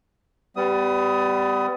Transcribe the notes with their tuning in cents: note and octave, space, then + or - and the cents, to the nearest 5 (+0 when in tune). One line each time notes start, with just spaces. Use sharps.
G3 +0 B3 +30 D#6 +15